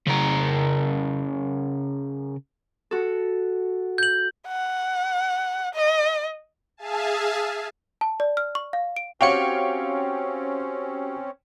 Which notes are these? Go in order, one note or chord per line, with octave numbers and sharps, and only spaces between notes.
C#3 A#4
F#4 A4
G6 F#7
F#5
D#5
G#4 E5 F5 G#5 A5
A5
D5
F6
C#6
F5
D7
C4 C#4 F#4 G4 C#5 F5 G5 C#7